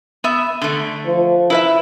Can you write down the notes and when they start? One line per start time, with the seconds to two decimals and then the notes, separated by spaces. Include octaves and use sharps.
0.24 B3 E5
0.62 D3 A3
1.06 F3
1.50 E4 B4 E5